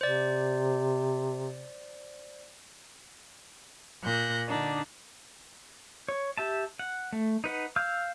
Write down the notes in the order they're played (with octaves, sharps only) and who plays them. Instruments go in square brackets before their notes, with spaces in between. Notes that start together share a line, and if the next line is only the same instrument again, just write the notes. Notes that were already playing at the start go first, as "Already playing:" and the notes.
[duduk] C3 [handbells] C5 D5
[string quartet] A#2 F#6 G6 A#6
D3 D4 D#4
[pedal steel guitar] C#5
G4 E5 A5
F#5
A3
D#4 B4 F#5
F5 E6 F6 G6